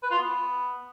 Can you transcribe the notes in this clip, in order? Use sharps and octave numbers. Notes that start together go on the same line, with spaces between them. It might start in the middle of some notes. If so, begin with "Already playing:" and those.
B4
F4
B3